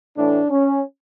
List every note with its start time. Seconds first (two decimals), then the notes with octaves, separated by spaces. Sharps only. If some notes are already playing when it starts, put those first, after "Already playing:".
0.17 A2 E3 A3 D4
0.51 C#4